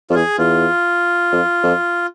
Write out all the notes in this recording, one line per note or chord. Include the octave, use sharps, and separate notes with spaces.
F2 F4
E2 G#4
E2 F4
F2
F2